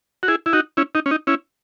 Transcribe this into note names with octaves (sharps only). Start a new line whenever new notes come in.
F#4
E4 G#4
E4
D#4 F#4
C#4 E4
D#4
C#4
D#4
C#4 E4